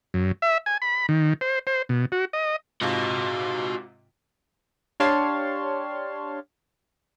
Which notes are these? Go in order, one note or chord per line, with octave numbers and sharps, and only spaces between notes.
F#2
E5
G#5
B5
D#3
C5
C5
B2
F#4
D#5
G#2 C3 F4 F#4 D#5
D4 G4 C#5 F5 A5 C6